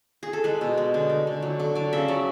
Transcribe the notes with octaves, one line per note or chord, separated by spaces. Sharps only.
G#4
A4
G#3 B4
B2
G#3
D3
A3
D3
F#3
D3
F#3 D5
C#3 E5
F#3 D5